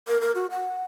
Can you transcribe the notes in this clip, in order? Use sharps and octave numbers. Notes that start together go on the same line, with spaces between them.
A#4
A#4
F#4
F#5